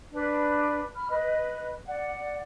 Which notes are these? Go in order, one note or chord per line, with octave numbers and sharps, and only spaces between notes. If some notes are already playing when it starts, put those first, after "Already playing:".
D4 B4
B5 F6
B4 D#5
D5 F#5